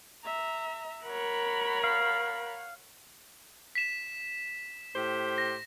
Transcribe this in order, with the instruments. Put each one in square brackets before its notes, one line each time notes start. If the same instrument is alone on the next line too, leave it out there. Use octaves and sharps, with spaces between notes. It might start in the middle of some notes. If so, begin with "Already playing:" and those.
[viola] E5 A#5
[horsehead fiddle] A#4 B5 [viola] C#5 F#5
[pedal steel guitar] F5
[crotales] B6 E7
[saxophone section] A2 G4 C5
[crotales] A#6